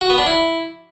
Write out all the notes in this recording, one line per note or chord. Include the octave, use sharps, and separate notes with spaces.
F#4
B3
D4
E4